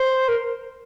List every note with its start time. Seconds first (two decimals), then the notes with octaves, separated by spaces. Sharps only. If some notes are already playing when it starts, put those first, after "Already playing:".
Already playing: C5
0.28 A#4